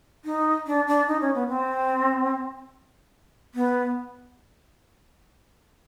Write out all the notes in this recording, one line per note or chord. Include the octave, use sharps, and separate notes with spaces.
D#4
D4
D4
D#4
C#4
B3
C4
B3